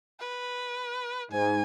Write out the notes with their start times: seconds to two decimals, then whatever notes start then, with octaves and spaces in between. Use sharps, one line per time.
0.20 B4
1.32 G#2 G#5